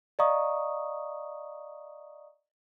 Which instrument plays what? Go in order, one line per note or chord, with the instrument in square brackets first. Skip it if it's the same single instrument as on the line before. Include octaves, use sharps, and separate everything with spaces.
[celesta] D5 D#5 F5 A#5 C#6 D#6